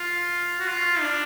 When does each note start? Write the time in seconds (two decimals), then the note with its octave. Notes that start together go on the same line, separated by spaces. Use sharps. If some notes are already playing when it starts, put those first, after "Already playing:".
Already playing: F4
0.60 F#4
0.68 F4
1.01 D4